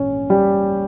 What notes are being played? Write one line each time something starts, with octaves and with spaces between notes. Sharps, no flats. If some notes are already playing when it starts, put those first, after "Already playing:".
Already playing: A#1 G#2 E3 C#4 C#5
G3 G4